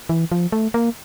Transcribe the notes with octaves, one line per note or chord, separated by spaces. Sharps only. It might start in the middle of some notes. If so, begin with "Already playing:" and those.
E3
F3
A3
A#3